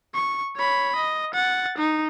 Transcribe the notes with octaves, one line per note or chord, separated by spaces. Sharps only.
C#6
C#5 B5
D#5
F#5 A6
D#4